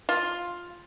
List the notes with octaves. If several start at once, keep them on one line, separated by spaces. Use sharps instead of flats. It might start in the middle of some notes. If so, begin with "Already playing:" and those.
F4